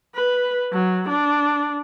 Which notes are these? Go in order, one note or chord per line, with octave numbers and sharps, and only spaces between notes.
B4
F#3
D4